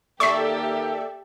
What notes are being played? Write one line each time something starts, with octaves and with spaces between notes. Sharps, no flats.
D#2 A#3 G4 A4 D5 E5 C#6 B6